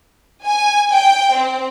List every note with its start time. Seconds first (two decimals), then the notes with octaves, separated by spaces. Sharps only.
0.45 G#5
0.93 G5
1.35 C4